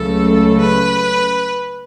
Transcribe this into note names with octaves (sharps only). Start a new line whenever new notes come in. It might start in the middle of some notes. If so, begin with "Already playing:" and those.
Already playing: C#2 C#3 F#3 A3 A4
B4